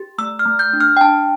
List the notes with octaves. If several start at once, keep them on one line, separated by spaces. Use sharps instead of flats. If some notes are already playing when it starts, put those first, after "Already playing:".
Already playing: G4
A3 E6
F6
A3
G6
D4
F6
G5
D4 A5